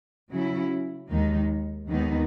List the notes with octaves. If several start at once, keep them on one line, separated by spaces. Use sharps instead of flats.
C#3 F#3 C#4 E4
D#2 D#3 G#3 D#4
D#2 D#3 G#3 B3 D#4